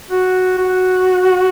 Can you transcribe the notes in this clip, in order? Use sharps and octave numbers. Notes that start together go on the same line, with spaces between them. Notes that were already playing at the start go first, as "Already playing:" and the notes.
F#4
F#4